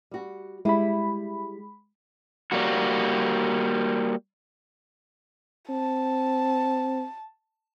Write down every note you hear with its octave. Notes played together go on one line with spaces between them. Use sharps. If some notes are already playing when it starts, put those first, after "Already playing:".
G3 F#4
G3 G#3 E4 B5
G3 A#3 F#4
C4 A5